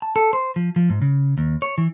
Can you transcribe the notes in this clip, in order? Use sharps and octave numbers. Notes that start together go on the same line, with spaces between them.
A5
A4
C5
F3
F3
G#2
C#3
D#2
C#5
E3